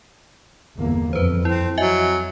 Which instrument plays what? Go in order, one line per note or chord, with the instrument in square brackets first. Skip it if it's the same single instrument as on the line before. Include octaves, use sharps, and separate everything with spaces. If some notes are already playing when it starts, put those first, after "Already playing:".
[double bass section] G1 E2 A#3
[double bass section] F2 [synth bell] B4 C5
[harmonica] C4 [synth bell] E4
[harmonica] F#3 [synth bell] D#5 E5 G#5